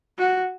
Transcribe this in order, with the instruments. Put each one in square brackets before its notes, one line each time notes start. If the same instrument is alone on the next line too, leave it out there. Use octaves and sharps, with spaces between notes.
[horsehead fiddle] F#4